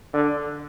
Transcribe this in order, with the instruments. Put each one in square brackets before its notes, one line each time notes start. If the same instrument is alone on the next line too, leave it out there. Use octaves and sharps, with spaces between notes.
[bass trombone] D3